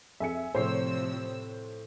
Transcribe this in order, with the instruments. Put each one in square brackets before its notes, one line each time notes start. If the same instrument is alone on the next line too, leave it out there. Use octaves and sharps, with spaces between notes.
[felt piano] F2 [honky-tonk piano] E5 G#5 C#7
[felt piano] A2 C6 C7 [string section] C3 F3 E6 [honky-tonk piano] C5 C#5